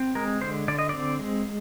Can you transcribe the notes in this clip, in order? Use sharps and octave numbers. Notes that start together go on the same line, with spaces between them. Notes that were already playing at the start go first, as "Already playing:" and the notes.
Already playing: C4
G#3 A#4
D3 C5
D3 D5
D#5
C4 D5
G#3